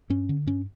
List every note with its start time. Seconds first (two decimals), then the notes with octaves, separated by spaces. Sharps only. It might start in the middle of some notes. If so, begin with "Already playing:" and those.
0.10 G2 C#4
0.29 D3
0.46 G2 C#4